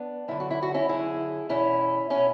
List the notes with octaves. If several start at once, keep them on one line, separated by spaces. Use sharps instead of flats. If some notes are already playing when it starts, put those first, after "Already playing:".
Already playing: B3 D4
F#2 D3 E4
F#4
E4
F#4
C#4 E4
F#2 D3 E4 G#4
E2 B2 C#4 E4
B2 C#4 E4